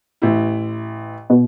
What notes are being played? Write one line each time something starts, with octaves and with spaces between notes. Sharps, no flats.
A1 E4
B2